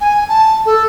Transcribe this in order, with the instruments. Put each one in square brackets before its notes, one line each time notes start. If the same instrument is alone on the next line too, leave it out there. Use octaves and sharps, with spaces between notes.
[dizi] G#5
A5
A4